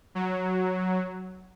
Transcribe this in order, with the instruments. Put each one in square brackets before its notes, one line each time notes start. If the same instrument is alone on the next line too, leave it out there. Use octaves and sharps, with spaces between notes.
[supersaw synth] F#3